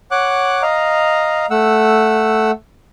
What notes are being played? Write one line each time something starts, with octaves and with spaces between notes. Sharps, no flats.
C#5 F#5 D6 F#6
D#5 F5 A#5
A3 F#5 E6